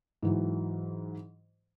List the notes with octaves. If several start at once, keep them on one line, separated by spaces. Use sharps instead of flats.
G#2 E3 F#3